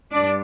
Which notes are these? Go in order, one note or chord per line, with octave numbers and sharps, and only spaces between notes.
G2 D4 D5